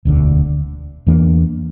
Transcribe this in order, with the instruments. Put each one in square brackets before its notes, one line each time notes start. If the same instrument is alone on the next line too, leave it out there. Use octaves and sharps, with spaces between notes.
[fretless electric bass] E1 D2 D3
E2 E3 A#3 D4